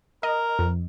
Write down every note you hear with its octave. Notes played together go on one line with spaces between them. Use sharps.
A#4 D#5
F2